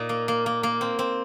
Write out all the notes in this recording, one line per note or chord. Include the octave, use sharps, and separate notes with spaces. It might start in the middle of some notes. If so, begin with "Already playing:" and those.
Already playing: A#2 D#4
A#3
A#3
A#3
A#3
C4
C4